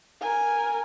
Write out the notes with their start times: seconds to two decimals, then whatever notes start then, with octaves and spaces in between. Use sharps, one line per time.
0.22 A#4 G#5